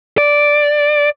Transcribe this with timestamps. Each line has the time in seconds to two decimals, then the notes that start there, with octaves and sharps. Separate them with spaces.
0.18 D5